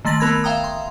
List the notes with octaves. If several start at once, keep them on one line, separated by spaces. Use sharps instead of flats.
D#3 A3 C6 A6 A#6 F#7
A3 B3 A#4 B5 G#6
E5 F5 G5 A#5 D#6
C6